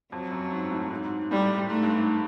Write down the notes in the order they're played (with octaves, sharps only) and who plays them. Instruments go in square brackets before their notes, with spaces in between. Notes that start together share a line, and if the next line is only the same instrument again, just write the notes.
[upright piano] F2 [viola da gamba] F#3
[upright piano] F#2
G#2
A2
G#2
G#2
[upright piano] A2 [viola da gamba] G3
[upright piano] G#2 [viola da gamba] A3
[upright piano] G2
G#2